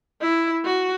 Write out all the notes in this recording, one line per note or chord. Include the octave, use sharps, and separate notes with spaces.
E4
F#4